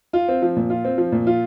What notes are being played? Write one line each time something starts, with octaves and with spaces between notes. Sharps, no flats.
F4
C4
F3
A#2
F4
C4
F3
A#2
F4